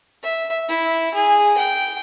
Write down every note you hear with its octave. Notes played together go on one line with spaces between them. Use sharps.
E5
E4
G#4
G5